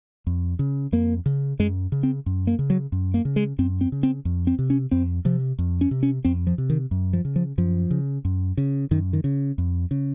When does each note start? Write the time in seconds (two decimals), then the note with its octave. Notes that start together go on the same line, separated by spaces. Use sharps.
0.27 F2
0.59 C#3
0.92 F2 A#3
1.26 C#3
1.59 F#2 G#3
1.92 C#3
2.03 C4
2.26 F#2
2.47 A#3
2.59 C#3
2.70 F#3
2.92 F#2
3.14 A#3
3.25 C#3
3.36 G#3
3.59 F#2 C4
3.81 C4
3.92 C#3
4.03 C4
4.25 F2
4.47 C4
4.59 C3
4.70 C#4
4.91 F2 C4
5.25 C3 F3
5.59 F2
5.81 C#4
5.91 C3
6.03 C#4
6.25 F2 C4
6.47 F3
6.58 C3
6.70 D#3
6.91 F#2
7.13 F3
7.25 C#3
7.36 F3
7.58 F#2 F3
7.91 C#3
8.25 F#2
8.57 C#3
8.91 F#2 D#3
9.13 D#3
9.24 C#3
9.58 F2
9.91 C#3